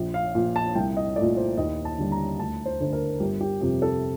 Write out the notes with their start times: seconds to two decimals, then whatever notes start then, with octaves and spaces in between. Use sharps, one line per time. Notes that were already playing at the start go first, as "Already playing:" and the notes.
Already playing: A#1
0.14 F5
0.35 A#2 F3
0.56 A5
0.75 C2 G5
0.97 D#5
1.16 A#2 A3 D5
1.37 C5
1.57 D#2 D#5
1.85 A5
1.98 D3 G3
2.12 A#5
2.39 D2 A5
2.66 C5
2.80 D3 A3 C5
2.93 A#4
3.20 G1 G4
3.41 G4
3.61 F2 C3 G4
3.82 A4